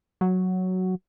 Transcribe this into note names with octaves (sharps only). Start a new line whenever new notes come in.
F#3